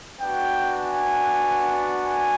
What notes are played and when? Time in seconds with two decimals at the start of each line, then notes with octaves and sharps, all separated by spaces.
0.21 B3 D4 F#4 G5
0.82 G#5
2.03 G#5